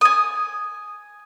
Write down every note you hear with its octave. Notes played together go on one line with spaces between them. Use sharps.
G#5 D#6